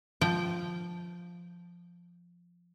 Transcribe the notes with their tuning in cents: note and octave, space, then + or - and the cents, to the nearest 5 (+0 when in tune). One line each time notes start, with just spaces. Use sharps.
F3 +0 G5 -25